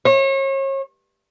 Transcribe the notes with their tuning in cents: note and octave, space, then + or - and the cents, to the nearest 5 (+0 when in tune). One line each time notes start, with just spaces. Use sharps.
C#5 -35